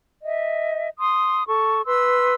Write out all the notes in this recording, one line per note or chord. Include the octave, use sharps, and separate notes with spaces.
D#5 E5
C6 D#6
A4 C#6
B4 C6 E6